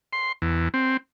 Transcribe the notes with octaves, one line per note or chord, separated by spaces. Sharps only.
C6
E2
C4